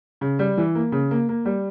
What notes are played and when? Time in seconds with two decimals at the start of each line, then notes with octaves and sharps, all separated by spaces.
0.21 C#3
0.39 G3
0.57 E3
0.75 A#3
0.92 C#3
1.11 A#3
1.29 A#3
1.45 G3